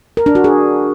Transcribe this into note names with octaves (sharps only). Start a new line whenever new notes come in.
A#4
D4
F#4
G#4